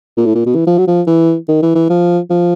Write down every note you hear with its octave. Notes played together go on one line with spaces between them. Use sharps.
A#2
A2
A#2
B2
E3
F3
F#3
F3
E3
D#3
E3
E3
F3
F3